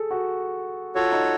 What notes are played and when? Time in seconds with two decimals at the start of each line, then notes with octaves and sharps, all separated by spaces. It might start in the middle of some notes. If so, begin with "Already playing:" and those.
Already playing: G#4 A4
0.11 F#4
0.95 F4 F#4 A4 C#5
1.12 D#4